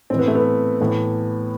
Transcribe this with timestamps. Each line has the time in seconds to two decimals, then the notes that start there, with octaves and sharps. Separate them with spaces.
0.10 A2 E3 C4
0.19 B3
0.28 A3
0.35 B3
0.81 A2 E3